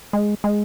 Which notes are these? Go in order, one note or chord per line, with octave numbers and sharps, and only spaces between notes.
G#3
G#3